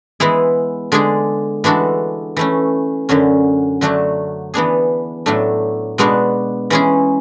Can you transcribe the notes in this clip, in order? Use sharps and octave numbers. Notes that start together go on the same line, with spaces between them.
E3 G#3 B3 E4 G#4
D3 G#3 D4 G#4
E3 G#3 D4 F#4 A4
E3 A3 C#4
F#2 D3 F#3 C#4
D3 F#3 A3 D4 F#4
E3 B3 D4 G#4
A2 F#3 A3 D4
B2 G#3 B3 D4 F#4
E3 G#3 C#4 G#4